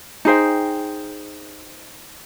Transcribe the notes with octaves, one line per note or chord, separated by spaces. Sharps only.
D#4 G#4 C5 G5